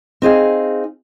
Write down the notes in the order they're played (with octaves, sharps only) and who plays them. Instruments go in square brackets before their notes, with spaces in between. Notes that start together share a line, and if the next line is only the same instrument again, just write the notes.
[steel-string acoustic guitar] C4 D#4 G#4 F5